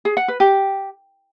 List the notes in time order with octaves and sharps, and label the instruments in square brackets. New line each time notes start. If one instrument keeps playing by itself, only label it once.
[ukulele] G#4
F#5
B4
G4